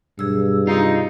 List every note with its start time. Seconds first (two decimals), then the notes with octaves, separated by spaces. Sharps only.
0.19 B1 G2 G#4 E6
0.67 C3 D#4 F4